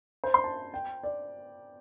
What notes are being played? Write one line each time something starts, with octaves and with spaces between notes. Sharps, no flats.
C5
C6
A5
G5
D5